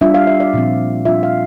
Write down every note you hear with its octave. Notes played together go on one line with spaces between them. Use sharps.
G3 D4 F4 E5
F5
E5
D5
A#2 F3 C4
G3 D4 F4 E5
F5